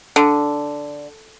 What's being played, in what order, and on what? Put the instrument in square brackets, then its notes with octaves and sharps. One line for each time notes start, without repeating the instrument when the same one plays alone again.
[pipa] D3